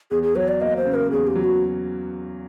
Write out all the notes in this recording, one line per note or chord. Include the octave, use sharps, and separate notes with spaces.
E2 G#4
G#4
F#3 C#5
D5
A#3 D#5
C5
C#3
A#4
E2 G#4
G4
F#3
F#4